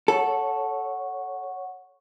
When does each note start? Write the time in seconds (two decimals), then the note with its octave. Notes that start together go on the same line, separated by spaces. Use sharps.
0.08 A4 C#5 F#5 C#6